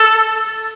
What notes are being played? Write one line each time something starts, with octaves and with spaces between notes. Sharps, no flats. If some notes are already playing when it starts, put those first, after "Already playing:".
Already playing: A4